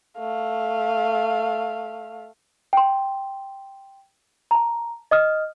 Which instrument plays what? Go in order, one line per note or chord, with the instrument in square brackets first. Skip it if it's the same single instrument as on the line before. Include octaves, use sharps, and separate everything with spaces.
[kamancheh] A3 F5
[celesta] G5 C6
A5 A#5
D#5 D#6 F6